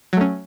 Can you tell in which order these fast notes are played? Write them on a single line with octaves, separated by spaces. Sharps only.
F#3 A3 C#4